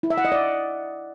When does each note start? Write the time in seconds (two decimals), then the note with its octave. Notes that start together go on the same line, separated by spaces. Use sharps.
0.03 E4
0.10 E5
0.18 F#5
0.25 D#5
0.32 D5